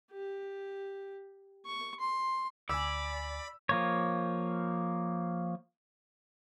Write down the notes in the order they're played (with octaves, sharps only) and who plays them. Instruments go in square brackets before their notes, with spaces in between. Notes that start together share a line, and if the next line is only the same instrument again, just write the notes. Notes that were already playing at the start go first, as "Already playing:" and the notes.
[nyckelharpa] G4
C#6
C6
[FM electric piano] D2 G#5 [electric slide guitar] D5 [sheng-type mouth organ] B5 [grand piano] E6
[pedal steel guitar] F3 A#3 C#5